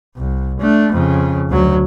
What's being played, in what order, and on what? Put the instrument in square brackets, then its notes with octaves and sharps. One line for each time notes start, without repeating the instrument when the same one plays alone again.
[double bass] C2
A3 D4
F2 C#3
D2 F#3